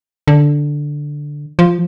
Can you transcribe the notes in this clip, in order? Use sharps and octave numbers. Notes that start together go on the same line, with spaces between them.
D3
F3